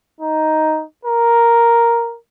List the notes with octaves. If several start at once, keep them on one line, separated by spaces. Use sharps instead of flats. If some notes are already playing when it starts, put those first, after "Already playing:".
D#4
A#4